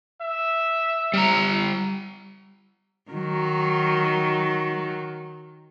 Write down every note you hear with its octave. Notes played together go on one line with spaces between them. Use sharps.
E5
G3 A#5
D#3 F#3